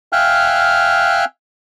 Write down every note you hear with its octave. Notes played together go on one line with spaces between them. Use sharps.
E5 F5 G5 G#5 F6 F#6